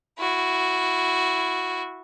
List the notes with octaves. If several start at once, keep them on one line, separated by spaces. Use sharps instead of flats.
E4 F#4